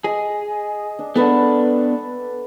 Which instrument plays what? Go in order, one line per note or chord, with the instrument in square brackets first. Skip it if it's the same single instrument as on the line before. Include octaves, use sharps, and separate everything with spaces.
[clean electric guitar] G#4 [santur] D#5
[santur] D4
[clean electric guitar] B3 D4 [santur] A4 B4 F#5